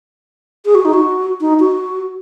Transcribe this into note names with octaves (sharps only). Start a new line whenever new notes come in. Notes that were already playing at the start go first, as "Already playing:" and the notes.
G#4
F#4
D#4
F#4
D#4
F#4